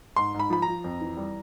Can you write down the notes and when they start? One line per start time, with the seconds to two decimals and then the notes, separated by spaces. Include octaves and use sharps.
0.16 G#2 C6
0.34 G#2
0.40 B5
0.50 F3 B5
0.62 F3 A#5
0.84 F2
1.01 E3
1.17 G3